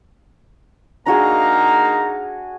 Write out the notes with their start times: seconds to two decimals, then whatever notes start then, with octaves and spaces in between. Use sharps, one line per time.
1.06 A#3 D4 D#4 F#4 G#4 F5 A#5